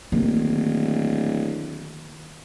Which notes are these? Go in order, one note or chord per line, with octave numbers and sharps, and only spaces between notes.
D1 D#3 A#3